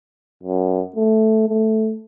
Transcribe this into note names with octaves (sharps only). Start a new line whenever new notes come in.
F#2
A3
A3